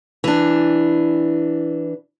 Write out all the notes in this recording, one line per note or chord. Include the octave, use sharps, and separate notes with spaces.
E3 D4